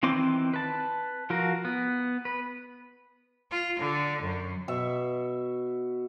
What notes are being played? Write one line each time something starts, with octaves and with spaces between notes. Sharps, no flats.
D#3 E3 C4 C6 D6
B4 A5
F3 F4 F#4 A#4
B3
B4
F4
D3
F#2
B2 E5 C#6